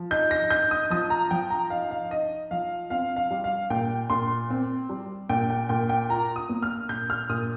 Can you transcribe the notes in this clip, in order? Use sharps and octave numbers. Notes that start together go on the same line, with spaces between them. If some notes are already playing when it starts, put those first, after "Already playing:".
Already playing: F3
D#4 G6
A#6
D#4 G6
D#6
F3 D#6
A#5
F3 G5
A#5
D#4 F5
F5
D#4 D#5
F3 F5
C4 F5
F5
G3
F5
A#2 G5
A#2 C6
C4
G3
A#2 G5
G5
A#2 G5
G5
F4 A#5
D#6
A#3
F6
A#2 G6
F6
A#2 D#6